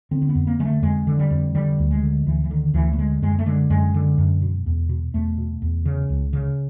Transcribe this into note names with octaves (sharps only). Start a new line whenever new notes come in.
D3 C4
C4
B3
F2
A#3
D3 G#3
A3
F2 G#3
D3
G3
F2
D3 G3
D2
G#3
D3
D2 E3
E3
D3 D#3
D2 E3
A3
D3 G#3
F#2 G#3
A3
D3 G#3
F#2 G#3
D3
F#2
B2
E2
B2
E2 A3
B2
E2
C#3
C#2
C#3